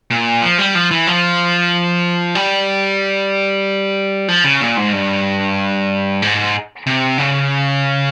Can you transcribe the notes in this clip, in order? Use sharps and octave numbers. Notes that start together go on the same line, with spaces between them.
A#2
F3
G3
F3
E3
F3
G3
F3
C#3
A#2
G#2
G2
G#2
C3
C#3